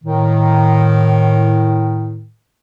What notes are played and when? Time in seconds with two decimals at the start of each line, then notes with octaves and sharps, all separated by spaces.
0.04 A2 D#3